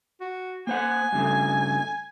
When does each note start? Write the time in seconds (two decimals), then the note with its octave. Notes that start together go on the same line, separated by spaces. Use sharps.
0.21 F#4
0.67 A#3 C5 F#5 G#5
1.13 G2 C#3 A3